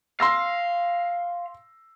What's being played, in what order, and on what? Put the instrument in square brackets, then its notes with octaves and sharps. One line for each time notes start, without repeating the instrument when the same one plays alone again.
[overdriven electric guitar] F5 [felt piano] C6 E6 A#6